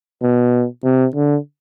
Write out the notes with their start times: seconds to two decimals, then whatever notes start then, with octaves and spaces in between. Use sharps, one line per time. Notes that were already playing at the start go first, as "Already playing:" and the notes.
0.22 B2
0.84 C3
1.15 D3